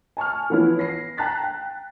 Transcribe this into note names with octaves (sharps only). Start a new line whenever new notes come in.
G#5 A5 C#6 F6
E3 F3 B3 C#4 E4
A#6 C7
G5 A5 A#5 F#6 A6 B6
G5